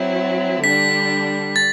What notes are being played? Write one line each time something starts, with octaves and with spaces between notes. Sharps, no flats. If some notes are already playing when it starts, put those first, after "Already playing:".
Already playing: F#3 C4 E4
D3 G3 D4 B6
A6